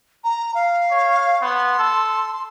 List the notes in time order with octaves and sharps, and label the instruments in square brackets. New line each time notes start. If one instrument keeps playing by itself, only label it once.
[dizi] A#5
F5
[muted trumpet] C#5
[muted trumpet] B3 [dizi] C6
[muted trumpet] A4